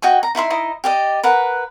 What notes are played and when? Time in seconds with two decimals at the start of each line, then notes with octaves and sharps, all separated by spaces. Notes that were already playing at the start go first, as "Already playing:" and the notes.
0.02 F#4 D#5 G5 G#5
0.23 A#5
0.35 D#4 E4 E5 C6
0.50 D#4 E4 D#5
0.84 G4 D5 D#5
1.23 A#4 B4 F#5